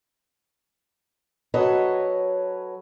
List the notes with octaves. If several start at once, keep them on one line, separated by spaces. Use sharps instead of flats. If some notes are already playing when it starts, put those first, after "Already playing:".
F#3 A4 B4 C#5 D#5